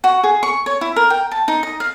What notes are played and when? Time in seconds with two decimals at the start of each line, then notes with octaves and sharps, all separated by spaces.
0.04 F#4
0.23 G#4
0.43 C#6
0.66 C#5
0.81 E4
0.96 A#4
1.10 G5
1.32 A5
1.48 D#4
1.63 D#5
1.80 F5